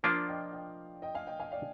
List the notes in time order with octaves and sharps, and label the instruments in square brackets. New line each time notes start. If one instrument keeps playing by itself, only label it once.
[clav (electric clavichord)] F3 A#3 D4 F4 [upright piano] D5 F5
[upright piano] D#5 G5
D#5 G5
D#5 G5
F5 G#5
D#5 G5
F5 G#5
D5 F5